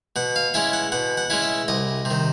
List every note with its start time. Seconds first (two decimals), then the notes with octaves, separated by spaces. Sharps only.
0.16 B2 F#5
0.36 F5
0.54 G#3 C#4 E4 E5
0.73 F#5
0.92 B2 F#5
1.17 F#5
1.30 G#3 C#4 E4
1.42 E5
1.68 C2 D#5
2.05 C3
2.10 D#3